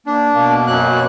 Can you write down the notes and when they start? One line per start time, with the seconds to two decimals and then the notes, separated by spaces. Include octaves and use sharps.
0.07 A#3 D4
0.33 B2 A#3
0.67 F#2 F#3 F#6